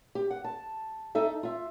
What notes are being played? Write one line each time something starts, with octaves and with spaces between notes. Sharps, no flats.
G4
F#5
A5
D#4 A4 E5
F4 E5